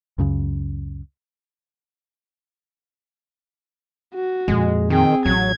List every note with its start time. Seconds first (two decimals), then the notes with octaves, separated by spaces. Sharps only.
0.18 C#2 F#2 C#3
4.15 F#4
4.48 F2 A#2 G#3
4.90 D#3 C4 G#4 G5
5.25 A1 F#3 G#6